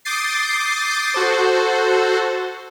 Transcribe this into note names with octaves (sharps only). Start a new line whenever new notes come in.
D6 D#6 G6 A6 C7
F#4 A4 C5